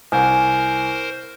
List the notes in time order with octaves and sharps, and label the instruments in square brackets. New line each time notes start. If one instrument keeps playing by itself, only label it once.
[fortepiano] C2 [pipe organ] A#4 C5 [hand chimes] G#5